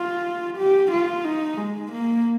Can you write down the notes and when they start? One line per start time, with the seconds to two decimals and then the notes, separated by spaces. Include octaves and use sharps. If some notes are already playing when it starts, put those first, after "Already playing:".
Already playing: F4
0.58 G4
0.92 F4
1.25 D#4
1.58 G#3
1.92 A#3